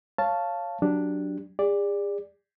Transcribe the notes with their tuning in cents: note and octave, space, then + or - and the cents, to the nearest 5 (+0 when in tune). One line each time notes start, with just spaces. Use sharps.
C#5 +0 F5 -10 A5 +0
F#3 +0 D4 +0 G4 +0
G#4 -40 D5 +0